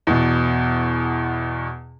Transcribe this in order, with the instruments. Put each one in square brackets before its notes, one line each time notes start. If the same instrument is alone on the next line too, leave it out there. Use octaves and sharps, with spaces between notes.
[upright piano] E2 B2